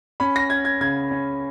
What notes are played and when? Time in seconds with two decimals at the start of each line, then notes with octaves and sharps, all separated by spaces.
0.20 C#4 B5
0.36 A#6
0.50 C#4 G#6
0.65 G#6
0.81 C#3 G#6
1.11 C#4